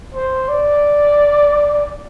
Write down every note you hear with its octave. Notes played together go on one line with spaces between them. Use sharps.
C5
D5